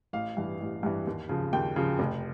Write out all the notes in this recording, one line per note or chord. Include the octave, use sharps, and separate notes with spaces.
A1 F5
G2 E3
A1
G2 E3
D#2
C#3 F3
D#2 G5
C#3 F3
F1